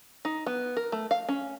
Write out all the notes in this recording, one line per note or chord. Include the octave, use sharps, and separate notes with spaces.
D#4
B3
A#4
A3
F5
C#4